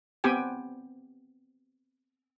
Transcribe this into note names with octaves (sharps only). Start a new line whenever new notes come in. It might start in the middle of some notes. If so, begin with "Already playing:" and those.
B3 C4 G4 G5 G#5